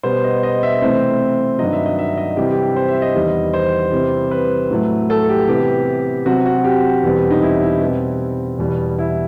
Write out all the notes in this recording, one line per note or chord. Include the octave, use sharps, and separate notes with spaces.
B2 G3 B3 C5
D#5
D#5
E5
C3 E3 A3 C4 C5
G2 D#3 F#3 D#5
E5
D#5
E5
D#5
C3 E3 G3 G4
G4
C5
E5
D#5
E2 D#3 G3 B3
C5
C3 E3 G3 C4
B4
A2 F#3 A3
A4
G4
C3 E3 B3 G4
C3 F#3 C4 F#4
F#4
G4
E2 B2 G3 C4
D#4
E4
E4
B2 G3 C4
E2 B2 G3 B3
E4